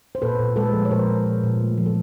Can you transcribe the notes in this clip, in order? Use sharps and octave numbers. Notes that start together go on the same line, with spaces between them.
C5
A#2 A4 B4
A#2
G#3 A4 B4
F3
C#5
A#2 A#4 C5
A#2
A#2
A#2
A3
F3
A4